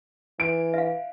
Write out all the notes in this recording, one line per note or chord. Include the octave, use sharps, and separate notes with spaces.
E3 D7
E5 F5